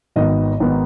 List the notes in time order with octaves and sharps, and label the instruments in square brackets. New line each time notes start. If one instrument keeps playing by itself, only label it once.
[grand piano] G#1 G#2 D#3 B3 D#5
G#1 G#2 D#3 B3